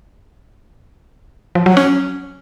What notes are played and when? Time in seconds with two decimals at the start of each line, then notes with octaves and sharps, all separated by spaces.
1.55 F3
1.66 F#3
1.77 C#4